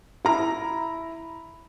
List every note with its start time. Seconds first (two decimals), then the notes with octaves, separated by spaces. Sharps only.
0.25 E4 A#5